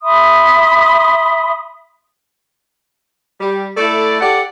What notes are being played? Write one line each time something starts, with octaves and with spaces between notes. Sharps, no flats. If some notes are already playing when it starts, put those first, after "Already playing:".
E5 B5 C6 D#6
G3
A3 E4 A4 D5
G4 A4 D5 F#5